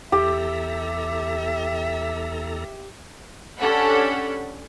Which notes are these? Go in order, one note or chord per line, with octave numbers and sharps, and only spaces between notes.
E2 G4 A4 E5 A#5
C#4 D4 G4 A4 F#5 B5